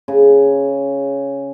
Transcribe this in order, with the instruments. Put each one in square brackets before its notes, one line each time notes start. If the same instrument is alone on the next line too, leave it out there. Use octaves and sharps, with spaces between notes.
[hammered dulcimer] C#3